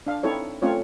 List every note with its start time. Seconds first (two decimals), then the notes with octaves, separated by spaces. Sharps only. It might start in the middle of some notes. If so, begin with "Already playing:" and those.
0.07 D4 F5
0.23 C4 D#4 E4 A4 C#5
0.62 A3 C4 C#4 F4 C#5